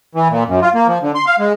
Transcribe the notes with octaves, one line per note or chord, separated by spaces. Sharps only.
E3
A#2
F#2
F4
A#3
F3
D3
C6
F5
G#3